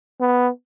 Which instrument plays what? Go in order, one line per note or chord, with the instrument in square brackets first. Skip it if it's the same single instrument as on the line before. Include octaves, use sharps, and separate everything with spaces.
[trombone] B3